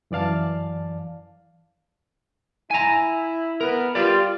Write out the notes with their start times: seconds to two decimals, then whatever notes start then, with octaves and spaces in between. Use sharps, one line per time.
0.11 F#2 E3 D5 F5 A5
2.71 E4 G#5 A#5
3.61 B3 A#4
3.95 F4 G4 D5